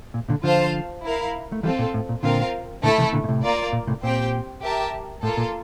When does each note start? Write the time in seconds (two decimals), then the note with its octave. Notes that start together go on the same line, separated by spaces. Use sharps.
0.14 A#2
0.28 A#2 D3
0.44 D3 F3 F4 C5 F5 A5
1.04 E4 A#4 F5
1.52 A3
1.63 E3 G3 C4 F4 A4
1.79 A#2
1.94 A2
2.09 A#2
2.23 A#2 D3 C4 F4 A#4 F5
2.83 A#2 D3 A3 E4 A4
2.98 C3 E3
3.13 A#2 D3
3.24 A#2
3.28 A2 C3
3.43 A#3 F4 A#4 D5
3.73 A#2
3.87 A2 C3
4.03 A#2 C4 G4 C5 G5
4.62 G4 A#4 E5 A5
5.22 A2 A#3 F4 A4
5.37 A#2